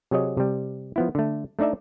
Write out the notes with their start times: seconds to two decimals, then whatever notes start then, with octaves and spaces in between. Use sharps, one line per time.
0.11 C3 F#3 G#4 C#5 D#5
0.37 C3 G3
0.96 F3 B3 E4
1.15 D3 A3
1.59 A3 D4 D#4 D5 E5